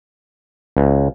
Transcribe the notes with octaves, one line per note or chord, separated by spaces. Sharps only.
C#2